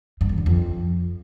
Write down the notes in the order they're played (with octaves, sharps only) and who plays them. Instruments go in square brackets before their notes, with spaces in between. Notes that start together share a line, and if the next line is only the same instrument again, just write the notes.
[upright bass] G2
E2
D3
F2